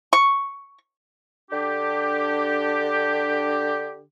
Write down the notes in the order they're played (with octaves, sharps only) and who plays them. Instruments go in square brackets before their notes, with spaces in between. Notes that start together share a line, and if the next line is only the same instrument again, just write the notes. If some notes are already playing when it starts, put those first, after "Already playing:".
[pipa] C#6
[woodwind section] D3 D4 G4